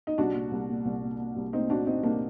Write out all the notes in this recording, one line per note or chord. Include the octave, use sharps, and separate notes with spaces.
D#4
C2 D4 F#4
A#2
C2
A#2
C2
A#2
A#2
C2
A3 C4 D#4
A#2 D4 F#4
A#2 C4 D#4
C2 A#3 D4